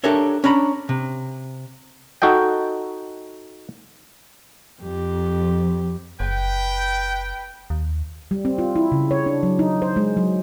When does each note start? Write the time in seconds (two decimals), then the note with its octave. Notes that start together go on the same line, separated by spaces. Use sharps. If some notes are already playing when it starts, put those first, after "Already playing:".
0.04 D4 G4 A4 A#4 C#5 E5
0.44 C#4 D4 A#5 B5
0.89 C3
2.22 D#4 F#4 A4 D#5 G5
4.82 F2 G4
6.20 F#1 B4 G5
7.70 D#2
8.31 G3
8.45 C4
8.58 F4
8.76 E4
8.92 C#3
9.11 C#5
9.26 D4
9.43 F#3
9.59 D#4
9.82 C5
9.96 G#3
10.17 F#3